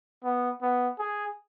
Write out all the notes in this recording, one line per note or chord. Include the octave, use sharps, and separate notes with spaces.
B3
B3
G#4